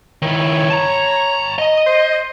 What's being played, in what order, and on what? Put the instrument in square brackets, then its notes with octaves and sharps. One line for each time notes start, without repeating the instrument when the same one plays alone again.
[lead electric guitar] D#3 E4 [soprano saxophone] C#5
[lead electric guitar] A5 A#5
D#5
[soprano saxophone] C5